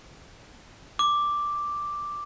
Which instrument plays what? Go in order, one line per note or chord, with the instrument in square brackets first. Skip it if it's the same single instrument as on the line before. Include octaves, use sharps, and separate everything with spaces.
[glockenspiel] D6